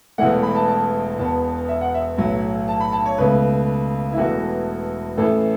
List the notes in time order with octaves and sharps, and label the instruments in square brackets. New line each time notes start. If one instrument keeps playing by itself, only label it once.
[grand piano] E1 E2 E3 A3 F#5
B5
A5
A5
E1 E2 B2 B3 A5
E5
F#5
E5
B1 A2 F#3
A5
B5
A5
C#5
C#2 B2 A3 B4
E4
E1 E2 E3 A3 F#4
A1 A2 E3 A3 A4